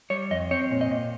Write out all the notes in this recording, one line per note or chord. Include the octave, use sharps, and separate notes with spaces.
G3 C#5
F2 D#5
C4 C#5
A#2
D#5
A#2